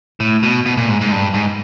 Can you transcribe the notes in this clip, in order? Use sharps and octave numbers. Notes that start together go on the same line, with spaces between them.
A2
B2
B2
A#2
G#2
G#2
G2
G#2